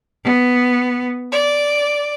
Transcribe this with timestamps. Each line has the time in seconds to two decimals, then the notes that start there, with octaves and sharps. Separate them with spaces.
0.24 B3
1.31 D5